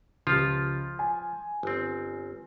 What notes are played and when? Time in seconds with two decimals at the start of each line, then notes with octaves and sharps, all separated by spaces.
0.27 C#2 F3 F4 G4
0.99 G#5
1.63 G1 C4